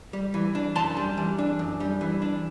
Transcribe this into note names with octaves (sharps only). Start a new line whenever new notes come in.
G3
E3
D4
F#2 A5 C6
G3
E3
D4
F#2
G3
E3
D4